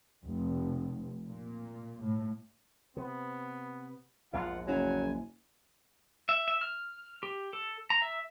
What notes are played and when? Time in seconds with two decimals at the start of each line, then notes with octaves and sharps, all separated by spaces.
0.25 F1
1.28 A#2
2.03 A2
2.97 C3 B3
4.33 A#1 E2 G#2 F4 F#5
4.67 F#1 F#3 G#5
6.29 E5
6.48 E5
6.61 F6
7.23 G4
7.53 A4
7.90 A#5
8.02 E5